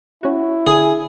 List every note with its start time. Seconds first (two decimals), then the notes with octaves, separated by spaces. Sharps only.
0.23 C#4 E4 F#4
0.67 D3 G#4 G#5